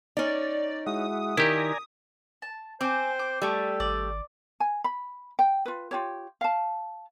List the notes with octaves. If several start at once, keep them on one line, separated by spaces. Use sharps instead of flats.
C#4 D#4 D5
G#3 E4 F#4 D#6
D#3 E4 G4 D5 G#5 A#5
A5
C4 C5 G#5 D6
D6
G3 A3 A4
G#1 D5
G#5
B5
G5
F4 B4
F4 G4 C#5
F5 A5